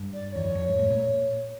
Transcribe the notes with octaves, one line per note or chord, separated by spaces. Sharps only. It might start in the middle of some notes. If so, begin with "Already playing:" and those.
Already playing: G2
D5
D5
E2 C#5
F2
F2
G#2
A2
A#2